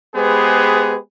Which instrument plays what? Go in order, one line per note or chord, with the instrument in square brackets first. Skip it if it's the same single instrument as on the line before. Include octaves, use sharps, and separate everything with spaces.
[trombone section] G#3 B3 G4 G#4 B4 C5